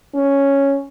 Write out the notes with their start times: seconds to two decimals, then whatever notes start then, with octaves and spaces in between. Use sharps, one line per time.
0.15 C#4